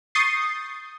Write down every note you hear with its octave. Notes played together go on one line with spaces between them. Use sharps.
C#6 D#6 G6 A6 C7